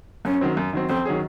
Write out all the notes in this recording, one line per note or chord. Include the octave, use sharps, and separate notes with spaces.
F#2 C#4
D#3 F#3 C4
F#2
D#3 F#3 C4
F2 C4
D#3 F#3 C#4 G#4